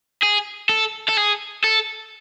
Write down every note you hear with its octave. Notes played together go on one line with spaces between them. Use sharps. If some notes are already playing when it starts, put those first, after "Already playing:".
G#4
A4
A4
G#4
A4